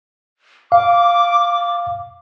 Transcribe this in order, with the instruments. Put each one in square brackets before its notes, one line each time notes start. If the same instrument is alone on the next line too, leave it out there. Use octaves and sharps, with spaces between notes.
[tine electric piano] F5 [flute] D6